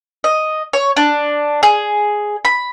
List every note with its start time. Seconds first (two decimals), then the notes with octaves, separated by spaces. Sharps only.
0.24 D#5
0.73 C#5
0.96 D4
1.63 G#4
2.45 B5